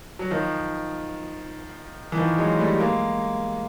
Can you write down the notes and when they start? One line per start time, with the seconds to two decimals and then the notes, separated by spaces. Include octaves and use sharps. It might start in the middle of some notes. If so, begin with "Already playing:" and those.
0.19 F#3
0.31 D#3 F3
2.12 E3
2.17 D#3 F3
2.38 F#3 G#3
2.59 G3 A3
2.80 G#3 A#3